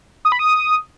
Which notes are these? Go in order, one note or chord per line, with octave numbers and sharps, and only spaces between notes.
D#6
B5
D#6